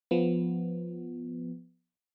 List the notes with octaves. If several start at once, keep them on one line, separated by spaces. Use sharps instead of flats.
F3 B3